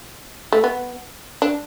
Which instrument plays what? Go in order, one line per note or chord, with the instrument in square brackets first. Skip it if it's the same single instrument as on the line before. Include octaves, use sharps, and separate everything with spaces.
[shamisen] A3
B3
D4